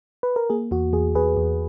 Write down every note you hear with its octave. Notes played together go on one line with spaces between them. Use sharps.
B4
A#4
A#3 G#4
E2 F#4
E2 G#4
E2 G#4 B4
E2